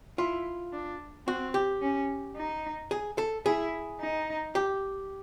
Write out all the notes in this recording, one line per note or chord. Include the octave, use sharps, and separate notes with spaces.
E4 F4
D4
C4 F#4
G4
C#4
D#4
G#4
A4
E4 G#4
D#4
G4